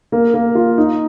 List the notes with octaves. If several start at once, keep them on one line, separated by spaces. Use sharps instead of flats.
A#3
A#3
F4
D#4